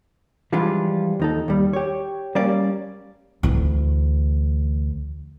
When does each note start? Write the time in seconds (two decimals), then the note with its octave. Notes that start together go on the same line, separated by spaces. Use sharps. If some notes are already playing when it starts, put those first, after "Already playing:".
0.52 E3 F3 G3 G#3 D4 F4
1.20 D#2 D#4 A4
1.48 D#2 G3
1.73 G4 C#5
2.35 G3 A#3 C#4 D5
3.43 D2 E3